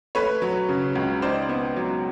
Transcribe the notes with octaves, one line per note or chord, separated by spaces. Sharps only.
A3 B4 C#5
F#3
C#3
C#2
D#4 C5 D5
B3
F#3